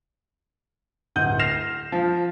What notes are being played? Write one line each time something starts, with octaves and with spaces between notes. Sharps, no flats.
D1 F#5 G6 D#7
F6 A#6 C7 E7 F7
F3